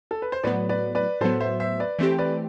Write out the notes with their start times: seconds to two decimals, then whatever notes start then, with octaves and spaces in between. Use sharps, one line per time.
0.11 A4
0.22 B4
0.32 C5
0.43 A2 F#3 B3 B4 D5
0.69 B4 D5
0.95 B4 D5
1.21 A2 F#3 B3 A4 C5
1.40 C5 E5
1.60 C5 E5
1.80 B4 D5
1.99 E3 A3 C4 G4
2.19 B4 D5